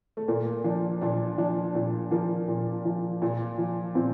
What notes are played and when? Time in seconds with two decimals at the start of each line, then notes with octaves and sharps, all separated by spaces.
0.17 A3
0.28 A#2 A#3
0.64 F3 D4
1.01 A#2 D4
1.38 F3 D4
1.75 A#2
2.11 F3 A#3
2.48 A#2
2.85 F3
3.22 A#2
3.58 F3
3.95 A#2 C4